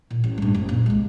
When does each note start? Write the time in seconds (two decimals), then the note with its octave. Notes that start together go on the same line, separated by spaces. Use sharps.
0.10 A#2
0.24 A1
0.38 G2 A3
0.54 F#1
0.69 A#2
0.86 C2 G#3